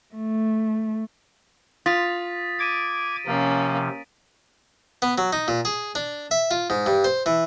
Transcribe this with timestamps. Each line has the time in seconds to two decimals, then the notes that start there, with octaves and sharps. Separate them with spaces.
0.15 A3
1.86 F4 D#6 A6 B6
2.59 D6 G#6 B6 D7 D#7
3.26 C3 F3 A#3 C#4
5.02 B3
5.18 F#3
5.33 D#4
5.48 A#2
5.65 G#4
5.95 D4
6.31 E5
6.51 F4
6.70 G#2
6.86 G2
7.04 C5
7.26 E3